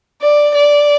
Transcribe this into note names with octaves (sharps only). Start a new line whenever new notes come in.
D5
D5